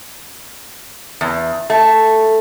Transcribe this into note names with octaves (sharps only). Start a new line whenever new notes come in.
E2
A3